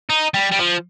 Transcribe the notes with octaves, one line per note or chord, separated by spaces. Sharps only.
D#4
G3
G3
F3